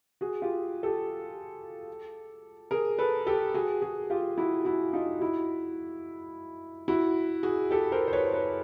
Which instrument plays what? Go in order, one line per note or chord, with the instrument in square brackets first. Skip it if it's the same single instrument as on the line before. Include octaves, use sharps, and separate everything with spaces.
[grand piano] F#4 G#4
F4 G4
G4 A4
G#4 A#4
A4 B4
G4 A4
F#4 G#4
F#4 G#4
F4 G4
E4 F#4
E4 F#4
D#4 F4
E4 F#4
E4 F#4
F#4 G#4
G4 A4
A#4 C5
C5
B4 C#5
C5
B4 C#5